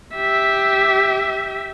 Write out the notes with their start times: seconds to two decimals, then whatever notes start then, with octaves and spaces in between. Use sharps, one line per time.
0.16 G4 E5